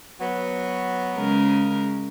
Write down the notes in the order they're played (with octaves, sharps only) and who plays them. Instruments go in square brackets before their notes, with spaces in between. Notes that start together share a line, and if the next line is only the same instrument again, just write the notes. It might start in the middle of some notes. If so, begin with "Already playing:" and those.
[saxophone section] F#3 B3
[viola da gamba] C#3 G#3 A#4